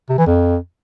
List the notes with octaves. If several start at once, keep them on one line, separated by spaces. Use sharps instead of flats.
C3
E3
F2